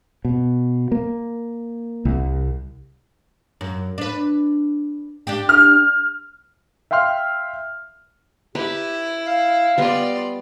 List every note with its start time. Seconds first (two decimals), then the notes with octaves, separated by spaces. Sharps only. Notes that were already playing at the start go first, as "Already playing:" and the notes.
0.25 B2
0.92 A#3
2.05 C2
3.61 F#2
3.98 D4 B4
5.27 D4 G4
5.49 F6
6.91 E5 F5 G5 C6 F6
8.55 E4 G4 B4
9.27 F5
9.78 G3 B3 F4 D5 D#5